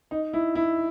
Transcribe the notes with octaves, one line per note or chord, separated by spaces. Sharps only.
D#4
E4
E4